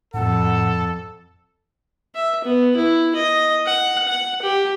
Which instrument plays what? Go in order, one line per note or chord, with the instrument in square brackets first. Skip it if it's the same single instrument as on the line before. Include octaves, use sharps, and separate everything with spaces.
[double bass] F2 [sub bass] A2 [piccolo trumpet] A4 [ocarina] F#5
[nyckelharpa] E5
B3
E4
D#5
F#5
F#5
G4